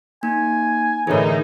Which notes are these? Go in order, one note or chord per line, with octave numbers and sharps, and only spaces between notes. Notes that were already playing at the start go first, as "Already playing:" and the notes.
A#3 D#4 G#5
A2 D3 E3 D#4 G#4 A#4 C#5